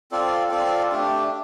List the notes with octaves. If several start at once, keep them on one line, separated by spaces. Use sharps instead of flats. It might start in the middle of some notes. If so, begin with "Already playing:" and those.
C4 F4 A4 D5
C4 F4 A4 D5
A3 D4 G4